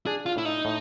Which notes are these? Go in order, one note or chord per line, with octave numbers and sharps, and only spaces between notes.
D4 G#4
F4
A2 E4
D#4
A2